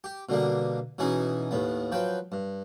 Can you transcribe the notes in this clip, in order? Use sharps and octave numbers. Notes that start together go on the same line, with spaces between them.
G4
B2 D3 G3 A#3
B2 E3 C#4 D#4 G#4
D#2 A2 B3
F3 F#3 B4 G5
G2